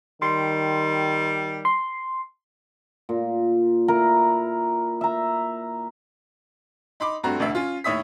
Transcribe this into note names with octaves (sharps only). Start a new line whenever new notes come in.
D#3 G3 C6
C6
A#2
E4 A#4 A#5
E5 A#5
D#4 B5 C6 D6
G2 A3 C4 F#4 A#5
E1 A1 D2 E5
C#4 F4
D#2 A2 C#5 E5 D#6 B6